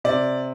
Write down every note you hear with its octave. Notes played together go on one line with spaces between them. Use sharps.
C3 D5